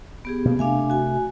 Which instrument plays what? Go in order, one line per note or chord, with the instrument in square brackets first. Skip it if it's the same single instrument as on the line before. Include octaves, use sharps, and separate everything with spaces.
[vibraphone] B3 G4 G#4
[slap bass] B2 A#3
[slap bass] C3 A3 [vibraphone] D4 F5 G#5
[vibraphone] F#4 G#5